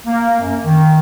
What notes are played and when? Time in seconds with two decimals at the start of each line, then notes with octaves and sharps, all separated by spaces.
0.07 A#3
0.40 F#2
0.64 D#3